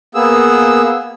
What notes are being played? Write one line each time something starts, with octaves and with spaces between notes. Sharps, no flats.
A#3 B3 G#4 E6